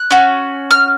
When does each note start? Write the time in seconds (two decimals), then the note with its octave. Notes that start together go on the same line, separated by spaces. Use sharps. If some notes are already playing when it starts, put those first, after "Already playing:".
Already playing: F#6
0.11 C#4 F#4
0.71 F6